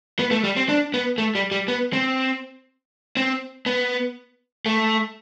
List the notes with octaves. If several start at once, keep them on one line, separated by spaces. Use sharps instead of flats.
B3
A3
G3
C4
D4
B3
A3
G3
G3
B3
C4
C4
B3
A3